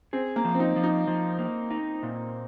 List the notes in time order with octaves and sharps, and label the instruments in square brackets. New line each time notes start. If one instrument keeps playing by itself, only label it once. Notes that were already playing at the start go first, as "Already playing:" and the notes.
[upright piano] C4 [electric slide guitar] G#4
[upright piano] A#3
[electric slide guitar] F3
[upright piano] C4
D#4
[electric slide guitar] F3
[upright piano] D#4
[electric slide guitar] F3
A#3
D#4
A#2